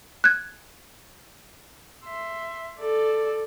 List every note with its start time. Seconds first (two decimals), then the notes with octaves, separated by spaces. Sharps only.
0.24 F#6 G#6
2.05 E5 C6
2.80 A4 D5